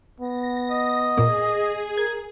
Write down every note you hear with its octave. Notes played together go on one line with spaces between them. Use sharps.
B3 A#6
D#5
A#2 A#3 G#4
A#4 G#6